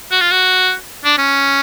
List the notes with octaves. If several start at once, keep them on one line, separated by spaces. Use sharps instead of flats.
F#4
F4
F#4
D4
C#4